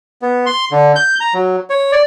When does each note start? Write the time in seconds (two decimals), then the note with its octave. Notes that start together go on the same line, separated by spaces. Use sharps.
0.22 B3
0.46 C6
0.71 D3
0.96 G6
1.20 A#5
1.34 F#3
1.70 C#5
1.92 D5